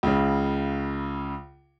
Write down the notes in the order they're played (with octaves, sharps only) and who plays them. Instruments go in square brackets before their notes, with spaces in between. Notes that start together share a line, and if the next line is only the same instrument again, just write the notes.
[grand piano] C#2 C#3